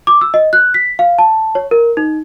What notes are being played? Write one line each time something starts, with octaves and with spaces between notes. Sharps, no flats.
D6
E6
D#5
F#6
B6
F5
A5
C#5
A#4
D#4